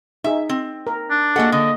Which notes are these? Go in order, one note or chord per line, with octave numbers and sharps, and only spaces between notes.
D#4 G#4 E5
C4
A#4
D4
A#3 F#4 G#4 A4 D#5 F#5
D3 D#5